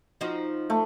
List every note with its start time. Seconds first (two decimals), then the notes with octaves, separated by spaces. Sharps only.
0.21 F3 D#4 F#4
0.70 A3